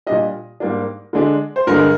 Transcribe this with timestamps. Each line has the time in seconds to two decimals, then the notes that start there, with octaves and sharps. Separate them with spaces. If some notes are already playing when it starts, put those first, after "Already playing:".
0.07 A#2 G3 D4 D#5
0.60 G#2 G3 A#3 D4
1.13 D3 G#3 D4
1.56 C5
1.67 G2 D3 G#3 A#4